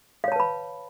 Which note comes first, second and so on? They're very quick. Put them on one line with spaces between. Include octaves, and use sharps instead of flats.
F5 C#5 A5 B4 B5